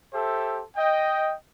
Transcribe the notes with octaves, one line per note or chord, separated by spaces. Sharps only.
G4 A4 C5 E5
D#5 G5